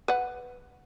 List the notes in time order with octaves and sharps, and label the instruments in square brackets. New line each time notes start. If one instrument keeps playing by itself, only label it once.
[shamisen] B4 F#5